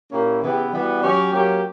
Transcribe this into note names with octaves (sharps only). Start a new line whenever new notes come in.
A#2 A#3 C#4 E4 G4
C#3 E3 B3 E4 G4
E3 G3 B3 F#4
F#3 C#4 G4
F#3 A#3 C#4 G4